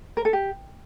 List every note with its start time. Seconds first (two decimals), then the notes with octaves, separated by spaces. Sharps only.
0.17 A#4
0.25 A4
0.33 G4